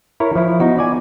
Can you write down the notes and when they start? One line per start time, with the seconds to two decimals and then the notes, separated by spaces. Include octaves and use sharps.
0.20 E4 A#4 C#5
0.35 F3 E4
0.60 B3 D#4 F#4
0.78 D5 G#5